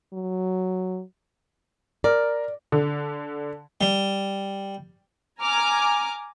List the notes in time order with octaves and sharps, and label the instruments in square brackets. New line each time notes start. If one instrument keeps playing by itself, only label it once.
[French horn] F#3
[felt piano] A#4 [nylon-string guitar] D5
[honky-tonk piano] D3
[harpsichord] G3
[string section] G#5 A#5 D6 F6